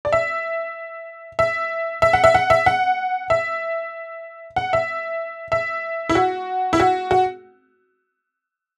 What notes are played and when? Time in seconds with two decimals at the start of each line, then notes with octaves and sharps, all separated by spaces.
0.05 D5
0.13 E5
1.39 E5
2.02 E5
2.13 F#5
2.24 E5
2.34 F#5
2.50 E5
2.66 F#5
3.30 E5
4.56 F#5
4.73 E5
5.52 E5
6.09 E4
6.15 F#4
6.73 E4
6.80 F#4
7.11 F#4